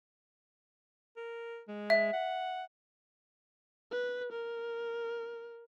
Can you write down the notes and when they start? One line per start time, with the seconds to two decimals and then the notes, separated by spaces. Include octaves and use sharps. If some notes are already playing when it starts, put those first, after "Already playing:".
1.17 A#4
1.68 G#3
1.90 E5
2.13 F#5
3.91 B4
4.32 A#4